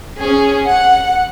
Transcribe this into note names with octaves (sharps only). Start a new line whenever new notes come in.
C#4 G#4
F#5